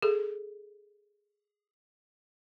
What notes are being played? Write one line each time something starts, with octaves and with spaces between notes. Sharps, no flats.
G#4 A4